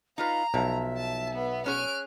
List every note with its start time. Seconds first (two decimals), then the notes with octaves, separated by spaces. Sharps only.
0.18 D#4 F4 B4 F5 A#5
0.54 B1 F3 E5
0.97 A5
1.34 B3
1.66 C#4 G#4 C#5 F6 F#6 D7